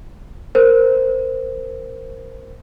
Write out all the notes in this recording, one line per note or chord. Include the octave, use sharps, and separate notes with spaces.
A#4 C5